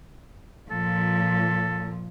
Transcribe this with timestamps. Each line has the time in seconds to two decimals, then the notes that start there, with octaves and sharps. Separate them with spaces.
0.71 A#2 F3 A4